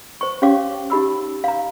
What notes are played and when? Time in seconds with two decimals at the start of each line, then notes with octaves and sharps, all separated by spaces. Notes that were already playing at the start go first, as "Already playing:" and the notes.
0.21 C5 C#6
0.42 C#4 G4 C#5 F5 D6
0.90 D#4 G4 B5 E6
1.44 F5 A#5